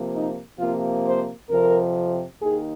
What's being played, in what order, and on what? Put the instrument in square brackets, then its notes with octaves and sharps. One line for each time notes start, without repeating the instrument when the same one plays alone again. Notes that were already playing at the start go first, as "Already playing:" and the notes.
Already playing: [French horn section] C3 F3 A#3
D#4
C3 F3 A#3 F4
C5
F2 C3 F3 A#4
D#2 D#3 G#4